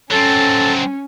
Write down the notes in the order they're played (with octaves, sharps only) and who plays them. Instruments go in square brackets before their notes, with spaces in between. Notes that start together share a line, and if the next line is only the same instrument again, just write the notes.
[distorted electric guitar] F#3 C4 [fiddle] C#4 [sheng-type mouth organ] A4